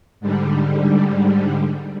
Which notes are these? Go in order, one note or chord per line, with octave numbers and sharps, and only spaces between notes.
G#2 D3 G3